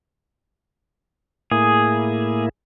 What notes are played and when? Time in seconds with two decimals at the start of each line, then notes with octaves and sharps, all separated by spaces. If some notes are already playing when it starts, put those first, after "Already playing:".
1.51 A2 A#3 E4 G#4